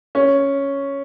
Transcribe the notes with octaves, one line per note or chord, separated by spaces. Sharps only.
C#4